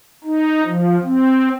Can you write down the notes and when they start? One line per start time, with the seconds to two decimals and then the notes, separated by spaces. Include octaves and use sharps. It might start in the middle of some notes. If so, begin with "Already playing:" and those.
0.24 D#4
0.64 F3
1.03 C4